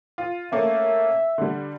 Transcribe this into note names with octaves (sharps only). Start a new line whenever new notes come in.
F4
A3 A#3 C#4 E5
D3 G3